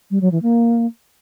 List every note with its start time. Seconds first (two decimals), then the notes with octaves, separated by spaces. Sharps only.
0.11 G3
0.21 F#3
0.32 E3
0.42 A#3